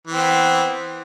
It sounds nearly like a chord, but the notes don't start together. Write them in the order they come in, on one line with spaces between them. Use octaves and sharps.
E3 C4 B3